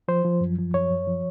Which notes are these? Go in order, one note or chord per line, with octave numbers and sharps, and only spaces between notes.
F3 C5
F3
F#2
F3
F#2 C#5
F#2
F3